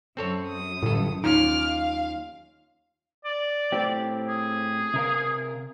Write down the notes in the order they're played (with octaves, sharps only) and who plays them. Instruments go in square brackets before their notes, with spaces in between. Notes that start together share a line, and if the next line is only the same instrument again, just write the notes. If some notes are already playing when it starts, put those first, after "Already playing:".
[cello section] F#2 [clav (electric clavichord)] C4 A4 C#5
[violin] D#6
[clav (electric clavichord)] G1 A4 [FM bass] A2
[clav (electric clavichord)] D#2 C#4 F4 [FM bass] D#4 [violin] D6 F6
[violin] F5
[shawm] D5
[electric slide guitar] A2 C4 G4
[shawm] G#4
[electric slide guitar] C3 A#4 F5